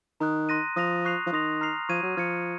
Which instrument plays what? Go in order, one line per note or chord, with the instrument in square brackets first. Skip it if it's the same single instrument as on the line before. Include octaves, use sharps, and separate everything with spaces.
[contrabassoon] D#3 [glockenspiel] A#5 D#6 F#6
[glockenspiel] C6 F#6 A#6 D#7
[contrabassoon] F3 [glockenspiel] D#6 A#6 F7
[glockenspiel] C#6 F#6 C7 F7
[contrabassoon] F3
[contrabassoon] D#3 [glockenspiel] C6 D#6 A#6 F7
[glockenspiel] A#5 F6 C7 F7
[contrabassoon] F3 [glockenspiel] C#6 G#6 D#7
[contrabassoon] F#3
[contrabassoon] F3 [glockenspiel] F6 G#6 C#7